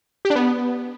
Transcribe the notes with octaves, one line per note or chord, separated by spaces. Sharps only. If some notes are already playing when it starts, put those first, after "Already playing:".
G4
D4
B3